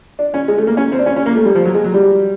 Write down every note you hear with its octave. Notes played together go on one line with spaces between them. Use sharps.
D4
C#4
G#3
A3
A#3
C#4
C4
D4
C#4
C#4
A#3
A3
G3
F3
F#3
G#3
F#3
G3